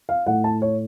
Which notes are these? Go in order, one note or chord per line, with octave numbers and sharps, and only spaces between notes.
F5
A2 A3 F#5
A5
C#5